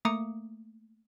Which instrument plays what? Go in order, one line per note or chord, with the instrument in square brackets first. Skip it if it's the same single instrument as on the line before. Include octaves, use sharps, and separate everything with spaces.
[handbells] A3 A#3 A#5 D6 D#6 C#7